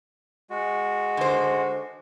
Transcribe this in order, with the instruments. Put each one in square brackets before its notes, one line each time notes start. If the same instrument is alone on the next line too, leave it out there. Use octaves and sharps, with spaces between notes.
[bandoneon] G#3 F#4
[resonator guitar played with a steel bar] D3 C5